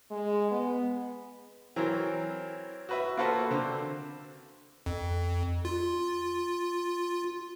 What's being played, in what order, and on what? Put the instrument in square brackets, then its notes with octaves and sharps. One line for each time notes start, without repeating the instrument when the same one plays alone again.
[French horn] G#3
B3
[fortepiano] E3 F#3 C4 A#4
F#4 B4 E5
A#3 F4 F#4 A4 B4 C5
D3 C4
[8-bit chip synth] F2
F4